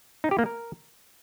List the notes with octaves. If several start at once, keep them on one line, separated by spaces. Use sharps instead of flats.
D#4
G4
A#3
A#4